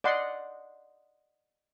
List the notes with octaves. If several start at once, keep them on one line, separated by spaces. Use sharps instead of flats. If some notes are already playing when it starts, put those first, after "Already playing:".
D5 D#5 F#5 C6